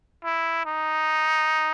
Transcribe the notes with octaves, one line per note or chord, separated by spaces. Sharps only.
E4
D#4